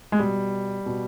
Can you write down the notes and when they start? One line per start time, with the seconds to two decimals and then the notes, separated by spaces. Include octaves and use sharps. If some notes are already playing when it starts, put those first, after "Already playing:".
0.12 G#3
0.20 B2 G3
0.86 B2